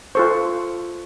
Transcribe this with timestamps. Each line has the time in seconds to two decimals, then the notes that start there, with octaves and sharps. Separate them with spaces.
0.15 F4 A4 C5 C#6